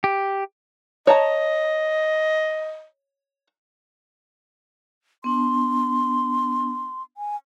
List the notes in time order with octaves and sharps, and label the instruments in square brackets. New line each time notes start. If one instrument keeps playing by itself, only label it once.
[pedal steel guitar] G4
[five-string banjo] C#5 A5 A#5 [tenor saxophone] D#5
[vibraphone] B3 D4 A5 [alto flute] C6
[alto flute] G#5